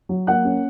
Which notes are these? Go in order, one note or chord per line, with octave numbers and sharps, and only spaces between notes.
F#3
A#3 F#5 F#6
C#4